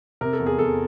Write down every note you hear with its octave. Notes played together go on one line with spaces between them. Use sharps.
C3 A#4
A4
E2
G#4
E2 A4